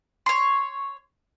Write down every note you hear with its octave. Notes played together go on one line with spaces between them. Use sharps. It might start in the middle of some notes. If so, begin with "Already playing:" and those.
C#5 C6